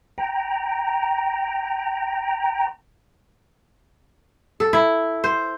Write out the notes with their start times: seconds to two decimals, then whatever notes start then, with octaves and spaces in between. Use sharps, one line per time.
0.18 G5 A#5
4.60 A4
4.73 E4
5.24 C5